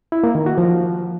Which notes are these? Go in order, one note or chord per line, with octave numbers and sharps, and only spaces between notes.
E4
A#3
D#3
F#4
F3